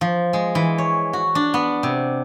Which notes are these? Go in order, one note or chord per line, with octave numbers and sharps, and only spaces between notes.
F3
G#3
E3
C#5
F#4
D4
B3
C3